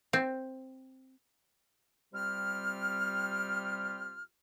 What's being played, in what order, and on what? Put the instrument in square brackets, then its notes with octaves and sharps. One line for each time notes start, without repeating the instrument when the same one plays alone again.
[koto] C4
[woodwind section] C3 G3 C4 F4 G4 F6